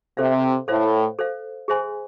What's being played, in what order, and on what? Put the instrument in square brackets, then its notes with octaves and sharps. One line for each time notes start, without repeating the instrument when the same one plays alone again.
[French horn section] C3 [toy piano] A4 C5 F5
[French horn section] A2 [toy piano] A4 C5 F5
[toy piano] A4 C5 F5
G#4 C5 E5 G#5 C6